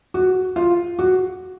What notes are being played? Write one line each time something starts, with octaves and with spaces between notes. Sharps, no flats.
F#4
F4
F#4